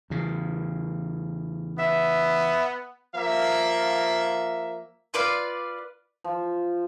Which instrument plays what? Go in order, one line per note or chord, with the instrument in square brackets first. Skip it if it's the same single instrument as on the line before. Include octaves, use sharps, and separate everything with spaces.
[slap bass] E2 C#3
[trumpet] B3 [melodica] E5
[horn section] F3 A#3 E5
[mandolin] F4 B4 D5 F5
[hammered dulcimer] F3